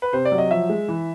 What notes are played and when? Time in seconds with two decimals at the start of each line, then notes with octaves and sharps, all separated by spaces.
0.02 B4
0.13 C3 C5
0.25 D5
0.32 F#3
0.38 D#5
0.51 F3 E5
0.69 G#3
0.88 E3